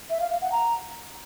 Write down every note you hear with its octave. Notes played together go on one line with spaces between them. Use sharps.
E5
F5
F5
F#5
A#5